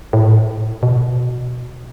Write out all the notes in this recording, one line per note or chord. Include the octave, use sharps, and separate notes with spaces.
A2
B2